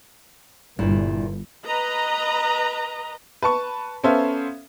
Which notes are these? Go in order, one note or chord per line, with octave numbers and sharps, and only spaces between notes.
G1 G2 A#2 E4
B4 D#5 A#5
B4 A5 C#6
B3 C#4 A4 C5 E5 F5